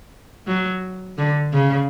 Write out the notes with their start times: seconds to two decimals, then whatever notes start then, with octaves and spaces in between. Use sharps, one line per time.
0.47 F#3
1.18 D3
1.53 C#3